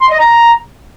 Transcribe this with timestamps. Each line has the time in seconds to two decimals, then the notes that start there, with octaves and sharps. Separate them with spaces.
0.01 C6
0.10 D#5
0.19 A#5